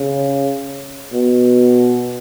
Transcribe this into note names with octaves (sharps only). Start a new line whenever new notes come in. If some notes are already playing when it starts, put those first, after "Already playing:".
Already playing: C#3
B2